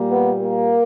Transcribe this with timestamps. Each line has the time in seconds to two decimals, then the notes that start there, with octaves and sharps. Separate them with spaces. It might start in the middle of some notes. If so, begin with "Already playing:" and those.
Already playing: A#2 G3 A#3
0.11 B3
0.41 A#3